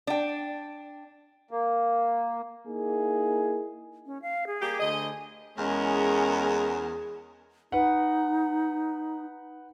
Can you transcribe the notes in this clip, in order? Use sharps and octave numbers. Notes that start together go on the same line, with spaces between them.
D4 G5
A#3
A#3 D#4 E4 G#4
C#4
F5
G#4
G3 A#3 G4
D2 D#5
G#5
E2 G#3 C#4 G#4 A#4
D#4 B4 F#5